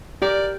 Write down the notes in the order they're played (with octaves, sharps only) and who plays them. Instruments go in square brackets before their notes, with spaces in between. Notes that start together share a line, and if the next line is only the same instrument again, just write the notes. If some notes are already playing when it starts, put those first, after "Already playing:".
[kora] G4 A#4 [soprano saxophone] D5